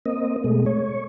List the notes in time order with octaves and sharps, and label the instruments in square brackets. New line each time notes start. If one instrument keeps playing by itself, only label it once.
[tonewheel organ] A#3 C4 D#5
B2 G#3 A3
C#5